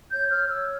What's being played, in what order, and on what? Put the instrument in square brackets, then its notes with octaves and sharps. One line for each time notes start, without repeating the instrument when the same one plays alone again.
[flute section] C#5 G6
C#5 F6
C#5 E6